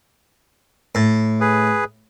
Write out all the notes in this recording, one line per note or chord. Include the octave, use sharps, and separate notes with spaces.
A2
G#4 B4